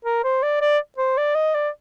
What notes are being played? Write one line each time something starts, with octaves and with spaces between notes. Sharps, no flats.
A#4
C5
D5
D5
C5
D5
D#5
D5